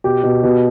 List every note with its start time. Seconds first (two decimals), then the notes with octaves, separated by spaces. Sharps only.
0.04 B2 G4
0.24 B2
0.43 B2